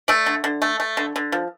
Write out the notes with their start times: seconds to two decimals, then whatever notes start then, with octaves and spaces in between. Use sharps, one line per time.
0.08 A3 D5 E5
0.26 D3
0.44 D3
0.62 A3
0.80 A3
0.97 D3
1.16 D3
1.32 F3